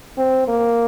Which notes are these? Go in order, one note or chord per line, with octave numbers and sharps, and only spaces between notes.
C4
A#3